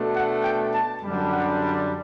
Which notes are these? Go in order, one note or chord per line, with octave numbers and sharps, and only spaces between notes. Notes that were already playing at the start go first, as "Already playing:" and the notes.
Already playing: B2 A3 D4
F#5
G5
A5
F#2 D3 G3 D4
F#5